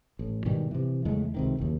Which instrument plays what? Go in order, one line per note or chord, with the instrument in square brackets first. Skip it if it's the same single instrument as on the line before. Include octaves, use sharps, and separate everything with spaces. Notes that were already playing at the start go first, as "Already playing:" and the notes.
[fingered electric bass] A1
G#2 B2 D#3 G3
C3 E3
E2 C#3 G#3 A3
C#2 C3 D#3
F#1 D#2